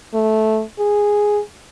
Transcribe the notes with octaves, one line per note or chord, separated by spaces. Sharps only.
A3
G#4